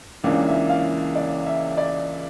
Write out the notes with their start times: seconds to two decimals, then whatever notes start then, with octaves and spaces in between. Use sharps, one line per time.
0.24 C#2 C#3 E3 A#3 D4
0.47 E5
0.69 F5
1.15 D5
1.46 E5
1.77 D5